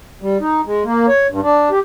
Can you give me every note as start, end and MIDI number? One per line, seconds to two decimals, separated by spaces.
0.22 0.38 55
0.41 0.61 63
0.65 0.83 56
0.84 1.06 58
1.08 1.27 73
1.30 1.40 43
1.43 1.69 62
1.71 1.79 67